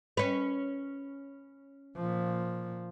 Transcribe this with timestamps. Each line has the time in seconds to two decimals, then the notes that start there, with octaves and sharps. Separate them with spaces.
0.17 C#4 B4
1.96 A#2 F3